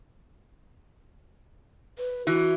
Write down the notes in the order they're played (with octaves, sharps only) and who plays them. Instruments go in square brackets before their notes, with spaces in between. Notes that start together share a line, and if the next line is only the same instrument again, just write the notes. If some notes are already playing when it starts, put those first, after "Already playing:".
[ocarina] B4
[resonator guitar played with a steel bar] E3 [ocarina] F#4